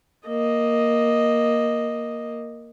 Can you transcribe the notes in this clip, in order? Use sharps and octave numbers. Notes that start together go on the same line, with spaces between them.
A#3 D#5